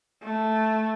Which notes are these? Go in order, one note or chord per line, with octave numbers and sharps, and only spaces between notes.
A3